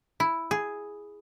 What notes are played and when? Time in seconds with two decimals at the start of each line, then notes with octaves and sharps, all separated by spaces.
0.20 E4
0.51 G#4